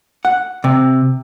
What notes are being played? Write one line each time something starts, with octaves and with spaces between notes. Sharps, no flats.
F#5
C3